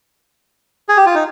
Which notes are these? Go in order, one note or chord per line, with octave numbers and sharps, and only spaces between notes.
G#4
G4
F4
D#4